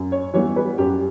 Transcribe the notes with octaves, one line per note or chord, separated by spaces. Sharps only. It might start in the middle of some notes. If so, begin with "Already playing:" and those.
Already playing: F#2
C#5
E3 G3 B3 C#5
B4
F#2 G4